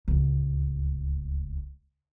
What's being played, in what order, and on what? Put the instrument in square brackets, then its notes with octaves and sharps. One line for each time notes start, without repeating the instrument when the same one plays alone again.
[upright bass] D1 C#2